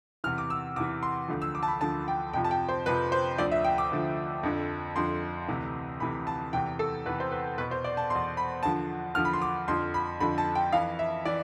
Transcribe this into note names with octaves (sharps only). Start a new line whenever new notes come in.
E2 C3 E3 F6
D6
E6
E2 C3 E3 D6
C6
D2 D3 F3
E6
D6
A5
B5
D2 D3 F3 A5
G5
F2 C3 F3 G5
A5
G5
C5
F2 C3 F3 B4
C5
D2 D3 F3 D5
E5
G5
D6
D2 D3 F3
F2 D3 F3
F2 D3 F3 C6
D2 C3 E3
D2 C3 E3 B5
A5
E2 C3 E3 G5
A4
E2 C3 E3 B4
C5
B4
E2 B2 B4
C5
D5
A5
E2 B2 C6
B5
E2 D3 F3 A5
E2 D3 F3 F6
B5
C6
D6
F2 D3 F3 C6
B5
F2 D3 F3 B5
A5
G5
F2 E3 F5
E5
E3 D5